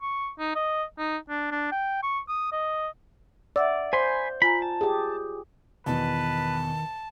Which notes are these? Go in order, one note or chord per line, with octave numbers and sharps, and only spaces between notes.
C#6
D#4
D#5
D#4
D4
D4
G5
C#6
D#6
D#5
D5 E5 F#5 E6
C5 G#5 B5 C6
F4 G#5 A#5 B5
A5
G4 G#4
E2 B2 D#3 B4 A5